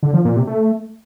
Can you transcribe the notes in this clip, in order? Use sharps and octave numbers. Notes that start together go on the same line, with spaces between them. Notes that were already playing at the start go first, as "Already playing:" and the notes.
D3
F3
A#2
C3
A3